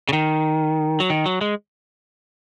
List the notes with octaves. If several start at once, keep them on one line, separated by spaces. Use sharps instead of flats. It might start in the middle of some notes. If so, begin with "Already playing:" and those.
C#3
D#3
F#3
D#3
F#3
G#3